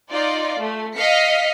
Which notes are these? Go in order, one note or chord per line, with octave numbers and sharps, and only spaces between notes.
D#4 F4 D5
A3
D#5 F5 B6 C#7